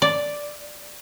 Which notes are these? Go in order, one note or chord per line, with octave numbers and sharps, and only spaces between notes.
D5